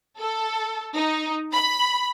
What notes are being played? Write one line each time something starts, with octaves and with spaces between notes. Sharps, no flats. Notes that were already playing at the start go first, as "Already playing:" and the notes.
A4
D#4
B5